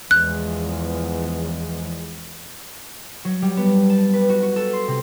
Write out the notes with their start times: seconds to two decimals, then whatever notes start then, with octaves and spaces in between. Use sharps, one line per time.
0.11 E2 F3 G#3 F#6
3.25 F#3
3.42 G3
3.57 B3
3.90 A5
4.13 B4
4.29 F#4
4.42 F#4
4.56 A4
4.73 C6
4.88 C3